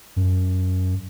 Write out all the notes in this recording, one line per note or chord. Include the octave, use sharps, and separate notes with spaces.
F#2